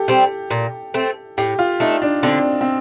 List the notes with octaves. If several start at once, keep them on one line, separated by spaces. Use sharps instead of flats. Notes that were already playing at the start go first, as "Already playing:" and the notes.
Already playing: G4 A4
G3 C4
A#2
A3 C4
A2 G4
F4
A3 D4 D#4
D4
D3 C4
C4